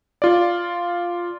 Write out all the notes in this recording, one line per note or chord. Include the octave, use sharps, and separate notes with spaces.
F4 D5